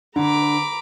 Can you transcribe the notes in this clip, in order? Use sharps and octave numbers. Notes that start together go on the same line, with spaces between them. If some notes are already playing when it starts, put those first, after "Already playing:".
D3 A#5 B5 D6